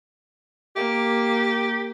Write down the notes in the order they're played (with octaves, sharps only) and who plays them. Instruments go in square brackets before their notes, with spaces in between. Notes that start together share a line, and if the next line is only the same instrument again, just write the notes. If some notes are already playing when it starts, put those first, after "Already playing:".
[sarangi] A#3 [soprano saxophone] G4